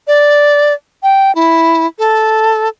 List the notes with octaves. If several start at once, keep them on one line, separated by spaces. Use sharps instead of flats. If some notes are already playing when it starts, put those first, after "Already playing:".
D5
G5
E4
A4